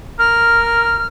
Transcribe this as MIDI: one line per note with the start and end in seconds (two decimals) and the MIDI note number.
0.19 1.07 70
0.19 1.07 89